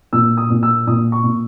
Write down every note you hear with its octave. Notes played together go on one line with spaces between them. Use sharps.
A#2 E6
D#6
A#2
E6
A#2 D#6
C#6
A#2